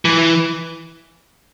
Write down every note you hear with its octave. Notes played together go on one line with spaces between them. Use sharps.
E3